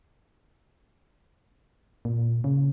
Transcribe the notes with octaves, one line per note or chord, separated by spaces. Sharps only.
A#2
C#3